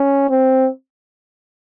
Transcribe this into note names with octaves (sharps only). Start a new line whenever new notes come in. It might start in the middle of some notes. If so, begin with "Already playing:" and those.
Already playing: C#4
C4